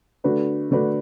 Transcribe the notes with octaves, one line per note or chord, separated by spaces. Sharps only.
D3 A3 D4 F#4 B4
D3 A3 D4 F#4 B4